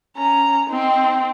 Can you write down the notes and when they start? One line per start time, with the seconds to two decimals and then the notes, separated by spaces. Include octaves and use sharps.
0.17 C#4 A#5
0.69 C4 D#4 G5